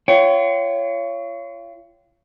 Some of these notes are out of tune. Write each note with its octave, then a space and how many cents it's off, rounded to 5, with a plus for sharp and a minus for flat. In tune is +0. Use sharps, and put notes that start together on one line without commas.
F4 -35 C#5 +15 G5 -35